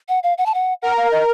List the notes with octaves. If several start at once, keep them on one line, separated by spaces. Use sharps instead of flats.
F#5
F5
F#5
A5
F#5
A#4 F#5
F5
D#5